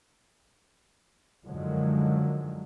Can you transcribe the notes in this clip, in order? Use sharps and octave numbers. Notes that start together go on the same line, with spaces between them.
F#2 D3 D#3 F3 F#3 G#3